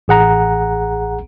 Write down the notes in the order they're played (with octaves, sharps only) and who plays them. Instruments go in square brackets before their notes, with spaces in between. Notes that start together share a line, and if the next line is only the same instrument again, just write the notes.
[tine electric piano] A1 G#4 F#5 A#5